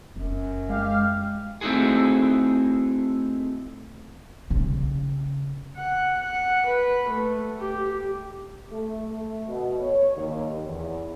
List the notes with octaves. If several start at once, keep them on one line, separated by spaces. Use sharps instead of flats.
F1 F#2
G#3 G4 F5
A3 C4 D#4 E4 F#4 G#4
C#3 G3
F#5
F#5
B4
A3
G4
A3
A3
B2
C#5
D#2
E2